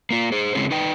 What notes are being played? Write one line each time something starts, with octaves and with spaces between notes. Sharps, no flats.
A#3 F4
G#4 C5
C#3 G#3 C4 C#4 E4 G#4
D#4 B4 G5